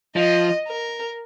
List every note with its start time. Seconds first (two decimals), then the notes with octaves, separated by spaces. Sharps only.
0.16 F3 D#5
0.68 A#4